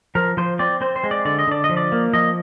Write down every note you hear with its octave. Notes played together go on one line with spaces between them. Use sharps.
F3 A#4
F3 C5
C4 D5
C4 C5
C5
G#3
D5
D3 D5
D#5
D3 D5
D#5
F3
D5
A#3
F3 D#5